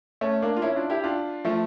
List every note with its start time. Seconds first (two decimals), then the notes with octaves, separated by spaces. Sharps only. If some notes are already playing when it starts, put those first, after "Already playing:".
0.21 A3 C#4
0.42 A#3 D4
0.57 F4
0.62 C#4 E4
0.75 D4 F4
0.90 E4 G4
1.03 D4 F4
1.45 F3 A3